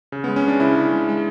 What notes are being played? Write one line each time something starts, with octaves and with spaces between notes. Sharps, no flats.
C#3
B3
G#3
C#4
G#3 D4
C#3 E4
C#3
G#3
G#3